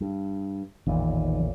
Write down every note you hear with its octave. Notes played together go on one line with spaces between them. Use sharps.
G2
A1 E2 A#2 D#3